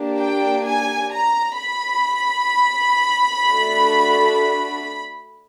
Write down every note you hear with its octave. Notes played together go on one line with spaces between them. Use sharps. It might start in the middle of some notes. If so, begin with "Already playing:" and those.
Already playing: A#3 D4 G4
G5
G#5
A#5
B5
A3 D4 F#4 A4